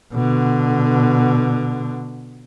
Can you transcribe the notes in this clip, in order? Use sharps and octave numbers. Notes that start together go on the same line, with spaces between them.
B2 D3